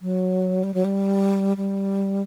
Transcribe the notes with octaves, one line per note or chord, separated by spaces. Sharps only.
F#3
G3
F#3
G3
G3